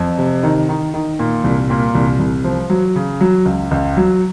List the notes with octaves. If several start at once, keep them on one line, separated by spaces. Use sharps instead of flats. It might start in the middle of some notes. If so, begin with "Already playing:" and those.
Already playing: F2
C3
D#3
D#3
D#3
A#2
C2
A#2
C2
C2
F3
F#3
C#3
F#3
C#2
C#2
F#3